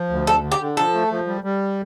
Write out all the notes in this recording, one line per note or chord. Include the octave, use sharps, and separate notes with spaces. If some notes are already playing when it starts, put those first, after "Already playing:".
Already playing: F3
D2
D3 A4
D3
G4
D3
F3 A4
A3
F3
G3
G3